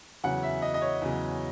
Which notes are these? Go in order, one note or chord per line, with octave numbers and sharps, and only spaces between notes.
E2 C#3 F#3 F#5
E5
D#5
D#5
C#5
E2 C#3 F#3